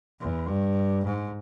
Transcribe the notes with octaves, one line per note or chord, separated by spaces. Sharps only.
E2
G2
G#2